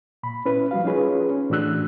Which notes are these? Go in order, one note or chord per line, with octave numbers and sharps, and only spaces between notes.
A#2 B5
C#4 E4 B4
F3 G3 F#4 F5
C#4 D#4 F4 G#4 B4 C#5
C#4
A2 E3 D4 F#4 E6 F#6